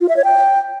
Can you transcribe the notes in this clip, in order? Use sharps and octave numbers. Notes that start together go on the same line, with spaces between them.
F4
E5
C#5
G5